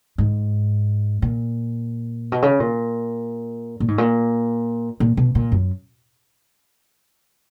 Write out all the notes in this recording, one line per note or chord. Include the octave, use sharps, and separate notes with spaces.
G#2
A#2
B2
C#3
A#2
A#2
G#2
A#2
A#2
B2
A#2
F#2